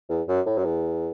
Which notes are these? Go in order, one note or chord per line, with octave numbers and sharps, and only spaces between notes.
E2
F#2
A2
F#2
E2